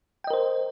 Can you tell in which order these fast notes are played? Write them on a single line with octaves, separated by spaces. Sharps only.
G5 D#5 A#4 C5